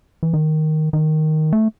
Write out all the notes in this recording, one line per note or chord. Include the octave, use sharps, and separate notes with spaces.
E3
D#3
D#3
A3